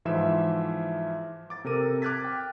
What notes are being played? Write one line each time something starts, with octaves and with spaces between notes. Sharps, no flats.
G#2 E3 F3 E5 E7
D6 A6
C3 A4 A#4 D#7
D6 F6 F#6 G#6 A6 B6
G5